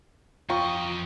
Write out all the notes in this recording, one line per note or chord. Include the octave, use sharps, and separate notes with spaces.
F2 F4 D#5 G5 A#5 C#6